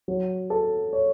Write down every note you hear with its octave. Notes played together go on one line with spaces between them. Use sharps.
F#3
A4
C#5